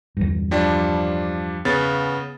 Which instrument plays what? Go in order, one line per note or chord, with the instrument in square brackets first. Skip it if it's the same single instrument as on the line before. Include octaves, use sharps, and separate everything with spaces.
[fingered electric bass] E2 G2
[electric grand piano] F3 G3 D4
C#3 B3 A6